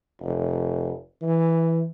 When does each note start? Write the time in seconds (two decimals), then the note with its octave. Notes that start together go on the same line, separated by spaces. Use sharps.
0.21 F1
1.22 E3